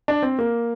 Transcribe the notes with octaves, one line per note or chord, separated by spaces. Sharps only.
D4
C4
A#3